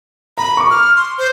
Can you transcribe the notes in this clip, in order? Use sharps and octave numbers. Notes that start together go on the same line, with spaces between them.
A#5 B5
C#6 D6
F6
C6
C5